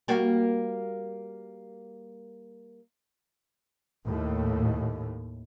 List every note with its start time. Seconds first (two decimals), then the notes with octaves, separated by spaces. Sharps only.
0.08 G3 A#3 F#4
4.05 D#2 A2